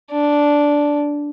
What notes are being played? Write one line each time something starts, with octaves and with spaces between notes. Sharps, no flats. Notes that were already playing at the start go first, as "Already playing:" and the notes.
D4